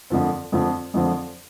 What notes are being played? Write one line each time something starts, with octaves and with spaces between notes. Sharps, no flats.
F2 D3 F3 C4
F2 D3 F3 C4
F2 D3 F3 C4